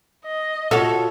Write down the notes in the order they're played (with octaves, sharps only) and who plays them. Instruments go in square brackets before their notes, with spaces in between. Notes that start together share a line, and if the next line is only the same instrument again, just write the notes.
[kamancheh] D#5
[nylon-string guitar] F4 F#4 C#5 [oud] A4 [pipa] E5 F#5